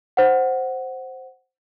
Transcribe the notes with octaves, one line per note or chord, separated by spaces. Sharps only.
C5 F#5